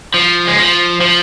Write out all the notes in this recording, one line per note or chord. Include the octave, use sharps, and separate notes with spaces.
F3
G#3
F3
F3